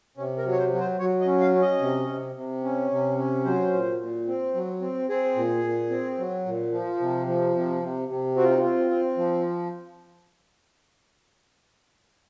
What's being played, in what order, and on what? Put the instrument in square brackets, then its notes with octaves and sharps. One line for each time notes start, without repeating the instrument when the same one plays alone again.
[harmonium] C3 C#4
A#4
F#3
C#5
C5
F#3
C5
F#3 C#5
D#5
C#4
F5
C#4
D#5
C3
C3
C3
C#4
C3
C#4
F#3 C5
A#2
A#2
C4
F#3
C4
C4 G#4
A#2
A#2
C4
F#3
A#2
F3
C3
F3
C3
C3
C3
C4 F#4
F4
D#4
F4
C4
C4
F3